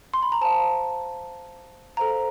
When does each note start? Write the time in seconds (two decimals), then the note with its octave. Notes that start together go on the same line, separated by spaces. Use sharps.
0.14 C6
0.23 B5
0.32 A#5
0.41 C5 F5 A5
1.97 A4 C5 F5 A#5